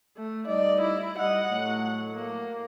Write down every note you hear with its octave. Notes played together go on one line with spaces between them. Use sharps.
A3
G3 D#4 D5 D#5
E4
G3 D#5 F#5
A2 F#3 A3
A#3